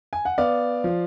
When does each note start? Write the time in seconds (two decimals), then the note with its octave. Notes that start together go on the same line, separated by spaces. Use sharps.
0.13 G#5
0.25 F#5
0.38 B3 D5 F5
0.84 F3